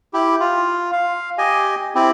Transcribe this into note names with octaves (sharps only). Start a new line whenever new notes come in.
E4 G4
F4
F5
G4 D#5 G#5
C4 E4 G4